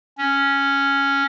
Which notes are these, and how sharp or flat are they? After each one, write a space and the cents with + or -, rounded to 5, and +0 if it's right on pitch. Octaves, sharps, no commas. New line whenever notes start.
C#4 +0